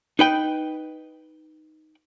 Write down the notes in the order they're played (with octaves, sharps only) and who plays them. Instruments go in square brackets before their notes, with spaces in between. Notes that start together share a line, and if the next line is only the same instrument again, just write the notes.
[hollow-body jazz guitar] D#4 B4 G5